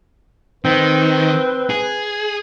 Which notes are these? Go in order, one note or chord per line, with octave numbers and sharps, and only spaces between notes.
D#3 C4 B4
G#4